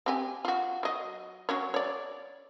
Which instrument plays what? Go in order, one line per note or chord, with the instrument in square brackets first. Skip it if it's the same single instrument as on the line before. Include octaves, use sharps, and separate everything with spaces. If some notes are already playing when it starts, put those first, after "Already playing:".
[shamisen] C4 G4 G#5
F4 F#4
F#3 D#5
F#3 C#4 C#5
C#5 D5